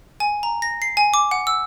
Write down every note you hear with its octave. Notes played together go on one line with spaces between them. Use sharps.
G#5
A#5
A#6
C7
G#5
D6
F#5
E6